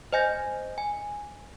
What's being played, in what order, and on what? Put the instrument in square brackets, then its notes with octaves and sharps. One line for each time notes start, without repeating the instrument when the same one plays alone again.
[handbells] C5 D#5 G#5 G6 A#6
G#5